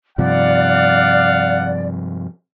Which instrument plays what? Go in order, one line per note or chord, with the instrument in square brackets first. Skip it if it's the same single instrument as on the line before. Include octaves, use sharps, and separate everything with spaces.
[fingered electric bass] G2 C3 F3 [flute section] D5 [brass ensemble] F5 F#5